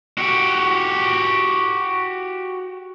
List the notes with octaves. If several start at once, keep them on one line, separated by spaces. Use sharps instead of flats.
F#4 G4